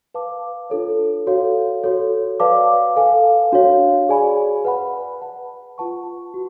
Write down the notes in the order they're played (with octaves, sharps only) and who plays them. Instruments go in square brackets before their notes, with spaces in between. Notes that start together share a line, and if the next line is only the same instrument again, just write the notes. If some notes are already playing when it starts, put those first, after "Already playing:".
[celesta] B4 F5 A5 D6
D4 F4 A4 C#5
F#4 A4 C#5 F5
F#4 A4 C#5
B4 D5 F5 A5 D6
A4 F5 G#5
D4 F#4 C#5 F5
G#4 D5 G#5 B5
B4 F#5 B5
B4 F#5 A5
F4 B4 F#5 A5 C#6
F#4